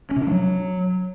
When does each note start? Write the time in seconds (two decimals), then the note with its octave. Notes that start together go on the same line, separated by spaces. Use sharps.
0.11 C#4
0.16 C3
0.21 D4
0.26 G3
0.32 F#3